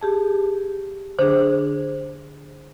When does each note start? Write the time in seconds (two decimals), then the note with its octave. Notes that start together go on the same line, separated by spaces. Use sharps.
0.01 G4 G#4 A5
1.19 D3 D4 G#4 C5